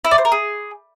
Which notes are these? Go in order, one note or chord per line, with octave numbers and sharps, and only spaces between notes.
E4
D5
C5
A#4
G#4